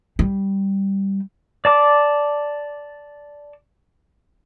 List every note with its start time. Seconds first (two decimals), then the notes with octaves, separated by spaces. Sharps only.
0.19 G3
1.65 D5 A5 D6